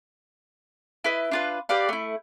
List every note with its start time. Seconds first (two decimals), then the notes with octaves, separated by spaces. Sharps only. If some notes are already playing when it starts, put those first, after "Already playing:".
1.04 E4 B4 D#5
1.31 D4 F4 B4
1.69 G4 B4 D5 F5
1.89 A3 E4